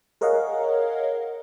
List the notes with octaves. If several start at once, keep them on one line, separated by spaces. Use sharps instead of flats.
G#4 A#4 C#5 D#5 F5 F#5